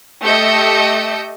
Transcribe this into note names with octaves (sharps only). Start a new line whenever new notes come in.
A3 G4 D#5 E6 G6 C#7